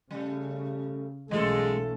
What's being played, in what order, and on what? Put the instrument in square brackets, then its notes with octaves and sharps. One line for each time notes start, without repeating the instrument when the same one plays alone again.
[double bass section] C#3 [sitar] G3 A3
[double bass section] B1 A3 C#4 [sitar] E3 F4 A4 [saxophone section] G#3